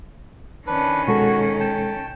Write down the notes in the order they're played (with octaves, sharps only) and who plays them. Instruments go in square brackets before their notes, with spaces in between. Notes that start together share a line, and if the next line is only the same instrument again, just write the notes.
[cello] D#3 C#4 [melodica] D4 B4
[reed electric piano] B2 G#3 A4 [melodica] F#4
[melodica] G5 A5